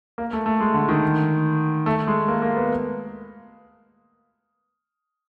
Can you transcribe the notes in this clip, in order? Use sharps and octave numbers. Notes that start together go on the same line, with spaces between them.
A#3
A3
A3
G#3
D3
D#3
A3
G#3
A#3
A#3
B3